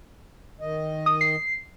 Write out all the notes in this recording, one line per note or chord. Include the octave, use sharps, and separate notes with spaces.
D#3 D#5
D#6
C7